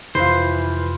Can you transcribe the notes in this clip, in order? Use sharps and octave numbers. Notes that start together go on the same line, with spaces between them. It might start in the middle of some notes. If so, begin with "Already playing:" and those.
F2 C3 E3 F4 B4 C5